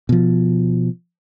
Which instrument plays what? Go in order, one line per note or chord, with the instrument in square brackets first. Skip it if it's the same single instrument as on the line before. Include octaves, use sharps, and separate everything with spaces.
[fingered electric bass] B2 F3